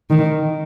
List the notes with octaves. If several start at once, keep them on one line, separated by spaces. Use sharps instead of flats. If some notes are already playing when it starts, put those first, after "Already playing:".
D#3